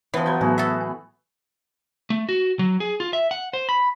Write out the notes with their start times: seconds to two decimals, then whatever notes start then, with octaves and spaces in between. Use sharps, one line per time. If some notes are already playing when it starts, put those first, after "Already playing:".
0.14 E3 F3 B3 C#5
0.26 F3 F#3 B3 G6 G#6
0.41 A2 F#3 A3 B3 F#4 G#4
0.58 A4 E5
0.81 G#5
2.10 A3
2.29 F#4
2.59 F#3
2.80 G#4
3.00 F4
3.13 E5
3.31 F#5
3.53 C5
3.69 B5